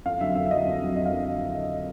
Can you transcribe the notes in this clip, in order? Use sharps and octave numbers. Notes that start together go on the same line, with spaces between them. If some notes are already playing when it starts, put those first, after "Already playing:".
F2 F5
D3 F#3 E5
F2 E5
E5
D3 F#3 D#5
F2
D3 F#3
F2 D#5
F5
D3 F#3